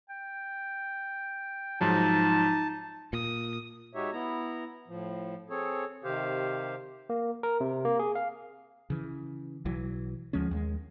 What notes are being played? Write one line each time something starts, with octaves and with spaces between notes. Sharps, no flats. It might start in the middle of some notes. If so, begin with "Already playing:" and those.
G5
G#2 F3 F#3 D#4 A5
A#2 D#6
G#3 D#4 F#4 G4 C#5 E5
B3 E4 A#5
A2 F3
C4 G#4 A4 C#5
C3 D#3 G4 C5 F5
A#3
A#4
C3
A#3
G#4
F5
C#3 E3
B1 E3 F#3
D2 F3 G#3 C#4
D#2 G3 G#3